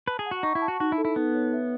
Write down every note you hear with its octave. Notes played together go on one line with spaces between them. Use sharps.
B4 A5
G#4
F#5
F#4
D#4 C#6
E4
A5
F#4
D#4 F#4
E4
A4
E4
B3 D#4
C#5
E5